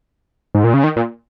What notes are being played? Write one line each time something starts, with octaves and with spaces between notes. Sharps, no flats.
G#2
A#2
C#3
D#3
A#2